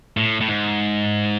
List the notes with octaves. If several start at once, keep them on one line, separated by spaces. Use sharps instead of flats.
A2
A2
G#2